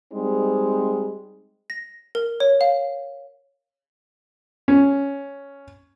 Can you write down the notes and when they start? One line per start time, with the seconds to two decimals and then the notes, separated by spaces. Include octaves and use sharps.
0.12 G3 G#3 C4 D#4
1.70 A#6
2.15 A#4
2.40 C#5
2.61 F5
4.68 C#4